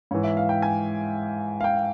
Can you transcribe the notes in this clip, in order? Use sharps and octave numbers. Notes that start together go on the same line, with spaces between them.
G#2 E3 C#5
E5
F5
G5
G#5
F5
G5